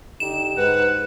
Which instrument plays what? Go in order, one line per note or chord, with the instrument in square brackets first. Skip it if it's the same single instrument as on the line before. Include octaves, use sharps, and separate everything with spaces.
[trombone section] D3 D#4 G4 [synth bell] E7
[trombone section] G#2 [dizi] B4 [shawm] F#5